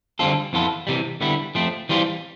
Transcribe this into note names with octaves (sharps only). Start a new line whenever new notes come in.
D3 G3 C4 F4 A4
F2 E3 B3 F4 A4
C3 E3 G3
D3 G3 B3 E4
F3 A3 C4
E3 G3 C4 F4